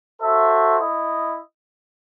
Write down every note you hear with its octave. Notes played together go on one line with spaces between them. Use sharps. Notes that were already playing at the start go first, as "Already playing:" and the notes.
F#4 A4 C5 E5
E4 D#5